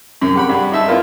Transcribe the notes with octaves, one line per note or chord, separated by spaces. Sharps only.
F#2 C3
G4 F#5 B5
G2
D#4 E5 A5
B3 E4 F4 A#4